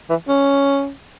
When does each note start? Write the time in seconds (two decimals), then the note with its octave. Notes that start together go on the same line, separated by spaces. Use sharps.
0.10 E3
0.28 C#4